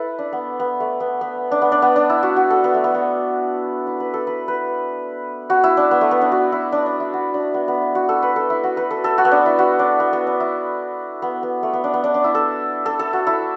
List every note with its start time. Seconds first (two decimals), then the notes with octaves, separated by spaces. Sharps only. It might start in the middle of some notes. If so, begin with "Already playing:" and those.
Already playing: E4 A4 B4
0.19 D4
0.32 B3
0.60 B3
0.80 A3
1.00 B3
1.21 B3
1.51 D4
1.62 B3
1.72 D4
1.82 B3
1.96 D4
2.10 E4
2.23 F#4
2.36 F#4
2.50 A4
2.64 B3
2.74 A3
2.84 B3
2.95 B3
3.87 E4
4.00 B4
4.14 A4
4.27 B4
4.48 B4
5.50 F#4
5.64 E4
5.77 D4
5.91 B3
6.01 A3
6.11 B3
6.21 D4
6.32 F#4
6.52 E4
6.72 D4
6.86 D4
7.00 E4
7.13 F#4
7.34 D4
7.54 B3
7.68 B3
7.82 E4
7.95 F#4
8.09 A4
8.22 B4
8.36 A4
8.50 E4
8.64 F#4
8.77 B4
8.91 A4
9.04 A4
9.18 F#4
9.25 B3
9.31 D4
9.46 E4
9.59 F#4
9.79 D4
10.00 B3
10.13 B3
10.27 D4
10.40 E4
11.22 B3
11.43 B3
11.63 A3
11.73 B3
11.84 D4
11.94 B3
12.04 D4
12.14 D4
12.24 E4
12.35 A4
12.86 A4
12.99 A4
13.13 F#4
13.27 E4